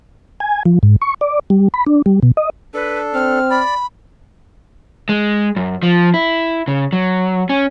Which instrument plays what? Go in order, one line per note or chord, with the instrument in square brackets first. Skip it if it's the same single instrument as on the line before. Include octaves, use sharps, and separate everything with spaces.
[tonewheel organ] G#5
F3
G#2
C#6
D5
G3
B5
D4
G3
B2
D#5
[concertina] D4 A4 [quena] B4
[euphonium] C4 [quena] F6
[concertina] D5 [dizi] B5
[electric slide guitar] G#3
F#2
F3
E4
C#3
F#3
C#4